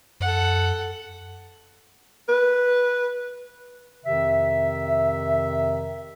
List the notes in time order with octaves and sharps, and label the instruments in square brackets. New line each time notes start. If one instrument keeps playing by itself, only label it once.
[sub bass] F#2 [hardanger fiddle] A4 F#5
[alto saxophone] B4
[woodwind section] F2 C3 D#3 E5